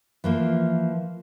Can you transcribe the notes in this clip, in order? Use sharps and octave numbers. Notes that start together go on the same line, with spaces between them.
E3 F3 A#3